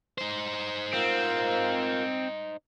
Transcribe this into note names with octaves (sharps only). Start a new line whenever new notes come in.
D#4 C5
C4 F4 A#4 F5